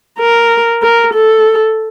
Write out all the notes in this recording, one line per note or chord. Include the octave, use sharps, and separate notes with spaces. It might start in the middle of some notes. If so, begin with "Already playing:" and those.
A#4
A#4
A4